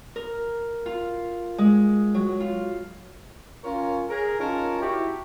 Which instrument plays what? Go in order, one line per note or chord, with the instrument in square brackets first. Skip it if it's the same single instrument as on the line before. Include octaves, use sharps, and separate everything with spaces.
[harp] A#4
F4
G#3
F#3
F4
[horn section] C#4 F4 A#4 C#5
G#4 A#4
C#4 D#4 F4 A#4 C#5 A5
E4 F#4 G4